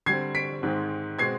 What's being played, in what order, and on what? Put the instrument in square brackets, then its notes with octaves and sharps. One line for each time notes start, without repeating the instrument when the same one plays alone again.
[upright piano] D3 G3 C4 G#6 C7
B6 D7
G#2 D#3 G#3 C4
B2 G#3 C4 G#6 C7